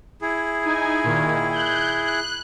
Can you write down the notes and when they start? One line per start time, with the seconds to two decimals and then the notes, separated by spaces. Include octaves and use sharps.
0.22 E4 G#4
0.65 D#4 G#5
1.04 A#2 D#3
1.53 F#6 G6
2.05 F#6